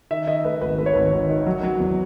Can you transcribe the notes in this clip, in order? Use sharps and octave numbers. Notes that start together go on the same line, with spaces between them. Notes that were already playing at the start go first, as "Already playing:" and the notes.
D#3 E5
D#3 D#5
A3 B4
G#1 B4
A3 B4
C#5
G#1 B4
G#1
D#3
F#3
F#3
E2